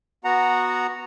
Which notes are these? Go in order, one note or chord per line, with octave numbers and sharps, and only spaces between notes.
B3 F#4 F#5 A#5